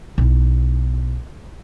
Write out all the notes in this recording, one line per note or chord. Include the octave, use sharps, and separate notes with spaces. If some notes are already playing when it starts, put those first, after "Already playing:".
B1 E4